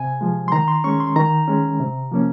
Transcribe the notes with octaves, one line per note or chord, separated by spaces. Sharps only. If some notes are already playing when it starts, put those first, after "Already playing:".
Already playing: C3 G#5
F3 G#3
C6
D#3 A#5
C6
G#3 C#4 C#6
C6
D#3 A#5
G#3 C#4
C3
F3 A#3 C#4